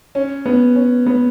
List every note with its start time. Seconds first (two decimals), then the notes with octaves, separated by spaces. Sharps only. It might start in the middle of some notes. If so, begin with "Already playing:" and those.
0.15 C#4
0.46 B3
0.76 C#4
1.06 B3